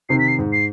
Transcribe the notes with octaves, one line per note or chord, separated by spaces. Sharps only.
C3 D#3 C7
B6
C7
G#2
C7